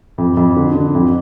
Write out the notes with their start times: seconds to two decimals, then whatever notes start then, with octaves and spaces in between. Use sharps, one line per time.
0.18 F2
0.37 F2
0.57 D3
0.75 D3
0.95 F2